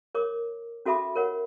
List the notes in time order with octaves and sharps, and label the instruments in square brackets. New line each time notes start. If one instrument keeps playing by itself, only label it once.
[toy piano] A#4 C#5 D6
C#4 F#4 A4 E5 B5 D6
A#4 C#5 F#5